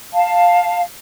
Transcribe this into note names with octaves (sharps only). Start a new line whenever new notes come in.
F5 A5